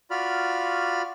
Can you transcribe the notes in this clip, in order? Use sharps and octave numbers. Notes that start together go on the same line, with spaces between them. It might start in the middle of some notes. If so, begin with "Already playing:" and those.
F4 F#4 D5 B5 F6